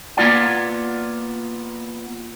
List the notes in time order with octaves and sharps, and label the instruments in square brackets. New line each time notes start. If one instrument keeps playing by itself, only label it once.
[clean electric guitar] A#3 B3 F4 D5 F#5